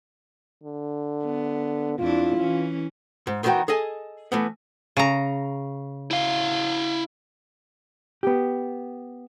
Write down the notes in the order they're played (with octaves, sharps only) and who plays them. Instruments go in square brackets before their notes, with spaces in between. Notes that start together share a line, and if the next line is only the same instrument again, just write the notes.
[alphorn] D3
[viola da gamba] B3
[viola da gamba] F2 D4 E4 [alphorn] F4
[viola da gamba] E3 C#4
[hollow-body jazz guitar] G#2
E2 D#3 E3 D#4 F#4 G5
G#4 A4 D#5 G#5
E3 A3 B3
[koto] C#3 A#5
[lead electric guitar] E4 F5
[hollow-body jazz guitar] B3 G4